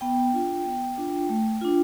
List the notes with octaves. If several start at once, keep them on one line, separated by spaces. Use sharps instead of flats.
B3 G5
D4 F4
B3
D4 F4
A3
D4 F4